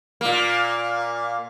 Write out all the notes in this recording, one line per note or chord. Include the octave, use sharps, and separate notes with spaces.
A#2 A#3